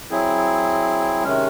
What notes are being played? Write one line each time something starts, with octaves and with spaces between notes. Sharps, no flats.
F#3 C4 E4 G#4
C3 D#3 G#3 C#4